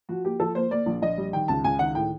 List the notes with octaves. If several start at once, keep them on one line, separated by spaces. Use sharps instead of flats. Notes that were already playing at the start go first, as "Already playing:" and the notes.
F3 F#4
A#3 G4
F3 A4
A#3 C5
A#3 D5
A#1
A#1 D#5
G3
D#3 G5
C#2 A5
C#2 G#5
D#3 F#5
A2 G5